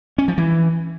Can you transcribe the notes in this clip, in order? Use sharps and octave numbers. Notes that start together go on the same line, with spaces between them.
C#4
F3
E3